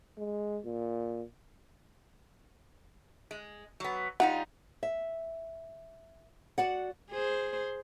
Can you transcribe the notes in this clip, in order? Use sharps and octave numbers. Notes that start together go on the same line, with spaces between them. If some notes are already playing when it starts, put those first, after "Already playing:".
G#3
A#2
G#3
F#3 B3
G3 D#4 F4 F#5
E5
F#4 D5 F#5
G#4 C5